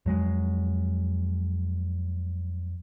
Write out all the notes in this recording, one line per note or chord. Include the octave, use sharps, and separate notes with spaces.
F2 F#3 G#3